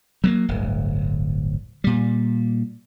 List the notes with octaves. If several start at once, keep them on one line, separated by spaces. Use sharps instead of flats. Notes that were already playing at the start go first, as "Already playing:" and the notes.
F#3 G#3 A#3
D1 G1
A#2 G3